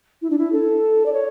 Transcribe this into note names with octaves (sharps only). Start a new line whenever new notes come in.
E4
D4
E4
A4
D5
C#5